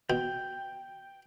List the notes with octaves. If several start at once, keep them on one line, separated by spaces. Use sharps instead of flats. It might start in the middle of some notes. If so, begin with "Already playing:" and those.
B2 G5